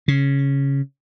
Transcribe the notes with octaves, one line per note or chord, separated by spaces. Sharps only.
C#3